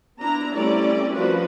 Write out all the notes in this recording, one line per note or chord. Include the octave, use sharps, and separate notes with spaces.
B3 D4 E4 A#5
G3 A3 C4 C#4 E4 D5
F3 F4 F#4 A#4 B4